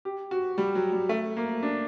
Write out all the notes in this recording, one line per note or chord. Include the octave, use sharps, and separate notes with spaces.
G4
F#4
G3
F#3
G3
A3
A#3
D4